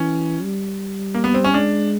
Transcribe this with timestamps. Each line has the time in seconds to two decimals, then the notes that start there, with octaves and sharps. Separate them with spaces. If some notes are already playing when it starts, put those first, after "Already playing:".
Already playing: E3 C#4
0.43 G3
1.14 A#3
1.24 B3
1.34 C4
1.44 C#4
1.54 G#3 D4